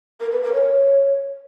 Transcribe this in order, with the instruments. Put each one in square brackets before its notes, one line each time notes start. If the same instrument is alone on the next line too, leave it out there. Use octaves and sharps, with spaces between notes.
[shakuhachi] A#4
B4
A#4
C#5